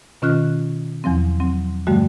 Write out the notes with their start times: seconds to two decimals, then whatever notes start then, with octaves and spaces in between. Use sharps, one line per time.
0.22 B2 D#3 C#4 F4 F6 F#6
1.04 E2 F3 F#3 C4
1.40 F#3 C4
1.87 G2 D3 F3 G3 A3 F#4